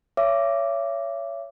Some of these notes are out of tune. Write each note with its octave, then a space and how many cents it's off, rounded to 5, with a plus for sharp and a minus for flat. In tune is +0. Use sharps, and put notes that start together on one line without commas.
C#5 +15 E5 +35 D6 +0